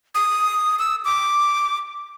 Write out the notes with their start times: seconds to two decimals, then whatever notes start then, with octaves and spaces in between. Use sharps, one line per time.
0.15 D#6
0.79 E6
1.05 D6